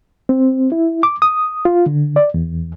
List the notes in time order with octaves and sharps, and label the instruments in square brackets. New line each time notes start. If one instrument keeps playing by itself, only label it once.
[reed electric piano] C4
E4
D6
D#6
F4
D3
D5
E2